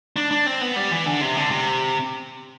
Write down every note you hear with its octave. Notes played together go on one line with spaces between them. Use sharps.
D4
D4
C4
B3
G3
E3
D3
C3
D3
C3